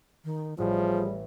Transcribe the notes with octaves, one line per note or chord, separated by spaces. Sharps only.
D#3
A1 A2 F3 G3 G#4